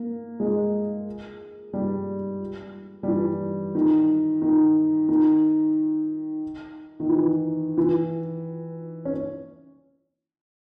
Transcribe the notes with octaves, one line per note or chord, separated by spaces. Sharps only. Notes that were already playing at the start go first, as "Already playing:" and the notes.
Already playing: A#3
G#3
G3
G3
E3
D#3
D#3
D#3
D#3
E3
E3
C#4